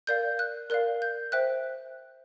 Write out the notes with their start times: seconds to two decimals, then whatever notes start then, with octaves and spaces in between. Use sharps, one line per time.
0.07 A#4 D5 F5 G6
0.39 F#6
0.70 A#4 D5 F5 F#6
1.02 G6
1.32 C5 E5 G5 F#6